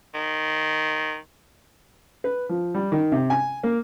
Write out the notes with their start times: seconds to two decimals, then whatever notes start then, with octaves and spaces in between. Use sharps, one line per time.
0.14 D#3
2.24 B4
2.49 F3
2.75 G3
2.92 D#3
3.12 C3
3.30 G#5
3.63 A#3